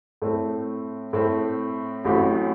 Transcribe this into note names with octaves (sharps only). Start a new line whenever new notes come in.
A2 A3 C4
A2 A3 C4
A1 A2 F#3 C4 G4